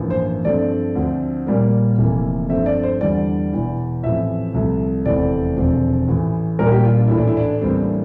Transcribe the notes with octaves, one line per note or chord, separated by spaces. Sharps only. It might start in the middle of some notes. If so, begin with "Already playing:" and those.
Already playing: A1 G2 F3 A#3
C5
G2 F3 A3 C4 D5
D2 D3 F3 C4
A#1 A#2 G3 A#3
F1 F2 E3 A#3
G2 F3 A3 C4 E5
D5
C5
E2 D3 G3 D5
E1 E2 E3
A1 A2 F3 C4 E5
C2 C3 F3 A3
F1 E2 E3 A3 C4 D5
E1 D2 C3 F3 C4
A1 A2 E3
A#1 A#2 G3 A#3 A#4
G4
F4
D4
A1 A2 E3 A3 E4
D4
E4
D4
A1 A2 G3 A#3 C4
D4